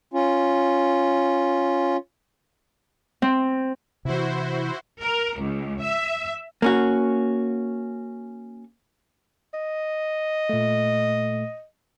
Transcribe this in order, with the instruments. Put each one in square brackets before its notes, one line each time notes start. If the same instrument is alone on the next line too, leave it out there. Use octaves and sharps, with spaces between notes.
[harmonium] C#4 F4
[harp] C4
[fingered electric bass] C3 E3 [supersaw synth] E4 F#4 C5
[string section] A#4
C#2
E5
[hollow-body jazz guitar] A#3 C#4 F#4
[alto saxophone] D#5
[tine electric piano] A#2 A3